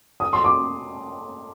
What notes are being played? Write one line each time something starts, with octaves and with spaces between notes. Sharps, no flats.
D#6
C6
D6